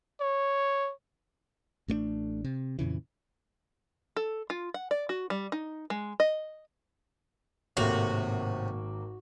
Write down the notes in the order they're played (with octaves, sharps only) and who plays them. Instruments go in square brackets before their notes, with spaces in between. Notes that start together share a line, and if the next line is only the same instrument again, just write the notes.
[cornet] C#5
[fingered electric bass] A1 A3 A#3 D4
C3
F2 A#2 C#3 E3
[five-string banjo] A4
F4
F#5
D5
F#4
G3
D#4
G#3
D#5
[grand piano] G#1 A#3 F7 [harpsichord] A2 C3 [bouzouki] F#4